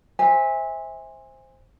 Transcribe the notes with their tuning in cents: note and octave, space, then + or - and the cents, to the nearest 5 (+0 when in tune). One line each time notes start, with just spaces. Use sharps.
C5 +10 E5 -20 G#5 -25